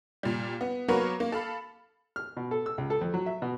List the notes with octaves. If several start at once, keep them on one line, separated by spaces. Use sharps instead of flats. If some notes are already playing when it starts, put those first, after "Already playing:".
A#2 G3
B3
F#3 A#3 B3 A#4 B4 C#5
A#3
A4 F5 B5
F6
B2
A4
E6
C#2
A4
F2
F#3
E5
B2